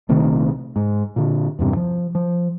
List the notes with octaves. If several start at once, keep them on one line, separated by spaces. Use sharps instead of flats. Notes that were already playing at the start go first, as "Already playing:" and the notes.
A#1 C3 D#3 A3
G#2
A#2 D3
E2 G2 C3
F3
F3